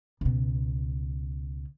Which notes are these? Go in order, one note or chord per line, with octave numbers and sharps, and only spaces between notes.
C#2 B2